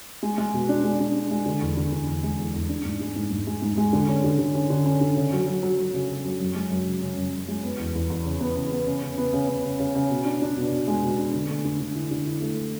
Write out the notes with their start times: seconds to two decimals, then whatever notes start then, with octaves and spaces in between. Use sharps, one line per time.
0.23 G#3
0.38 G#3
0.54 B2
0.69 D4
0.84 G#3
0.99 D4
1.15 D4
1.31 G#3
1.46 D3
1.61 E2
1.77 D3
1.92 D3
2.08 E2
2.23 G#3
2.39 E2
2.54 E2
2.69 D4
2.85 G#2
3.00 G#3
3.16 G#2
3.31 G#2
3.47 G#3
3.62 G#2
3.77 G#3
3.93 D3
4.08 C#4
4.24 D3
4.39 D3
4.55 C#4
4.70 D3
4.86 C#4
5.01 D3
5.17 C#3
5.32 F#3
5.47 F#3
5.63 F#3
5.78 F#3
5.94 C#3
6.09 C#3
6.25 F#3
6.40 F#2
6.55 G#3
6.70 F#2
6.86 C#3
7.02 C#3
7.17 F#2
7.33 F#2
7.48 G#3
7.63 B3
7.79 E2
7.95 E2
8.10 E2
8.25 C#3
8.41 B3
8.56 C#3
8.71 B3
8.87 C#3
9.02 C#3
9.18 B3
9.33 C#3
9.48 C#3
9.64 C#3
9.79 C#3
9.95 C#3
10.10 B2
10.25 D4
10.42 D4
10.57 B2
10.72 B2
10.87 G#3
11.03 B2
11.19 D4
11.33 D3
11.49 A3
11.65 D3
11.80 D3
11.95 E4
12.11 D3
12.27 E4
12.42 A3